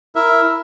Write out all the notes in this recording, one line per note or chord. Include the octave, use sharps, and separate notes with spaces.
E4 A#4 E5